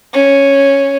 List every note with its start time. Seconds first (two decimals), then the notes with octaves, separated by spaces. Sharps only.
0.14 C#4